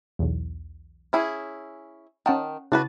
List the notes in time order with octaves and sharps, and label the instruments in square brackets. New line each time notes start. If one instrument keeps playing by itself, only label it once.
[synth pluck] B1 E2
[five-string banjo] C#4 E4 G#4
[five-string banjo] D#3 A5 [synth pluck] C#4 F#5 G5
[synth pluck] C#3 E4 A6 [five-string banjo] D4 F#4 B4